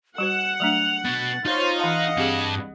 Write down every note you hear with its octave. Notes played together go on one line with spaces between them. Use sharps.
G3 F#4 C5 F#5 E7
F#3 A3 D4 F7
B2 A6
D#4 F4 C5 C#5
E3 D#5 F5 F#5 A5
G2 C4 G4 G#4 A5